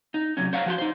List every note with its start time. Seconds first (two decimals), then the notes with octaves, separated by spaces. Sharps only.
0.14 D#4
0.37 C3 F#3 C#4
0.53 C5 C#5 F5 F#5 A#5
0.66 F3 F#4 C6
0.78 D#4 C5